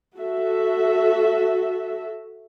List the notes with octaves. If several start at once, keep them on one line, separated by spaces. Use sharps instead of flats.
F#4 A4 E5